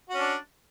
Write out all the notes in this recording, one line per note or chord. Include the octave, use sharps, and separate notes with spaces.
C#4 D4 F#4